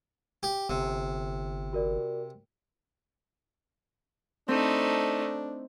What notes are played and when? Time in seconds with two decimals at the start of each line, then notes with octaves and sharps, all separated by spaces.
0.43 G4
0.70 G1 C3
1.73 F#4 A#4 D5
4.48 A3 C4 D4 D#4